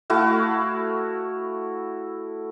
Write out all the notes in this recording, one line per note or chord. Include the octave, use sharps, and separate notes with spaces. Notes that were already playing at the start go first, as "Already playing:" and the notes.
A3 E4 F#4 F5